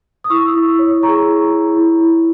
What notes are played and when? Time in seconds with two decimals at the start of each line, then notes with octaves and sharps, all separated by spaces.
0.24 D#6
0.30 E4 C#6 E6
0.54 E4
0.79 C#5
1.03 G#4 A#5 C#6
1.27 E4
1.52 E4
1.77 E4
2.00 E4